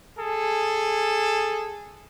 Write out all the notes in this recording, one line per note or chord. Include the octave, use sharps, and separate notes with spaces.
G#4 A4